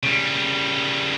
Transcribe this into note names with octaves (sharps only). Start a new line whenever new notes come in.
C#3 G3